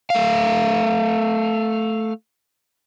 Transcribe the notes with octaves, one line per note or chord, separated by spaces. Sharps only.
A3 F5